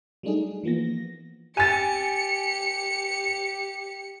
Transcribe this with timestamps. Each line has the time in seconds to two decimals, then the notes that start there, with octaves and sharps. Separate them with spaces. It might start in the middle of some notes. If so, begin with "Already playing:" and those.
0.23 F#3 G3 A3 D4 D#4 G#4
0.63 E3 F3 A#3 B3 A#6
1.57 G4 G#5 A6 C#7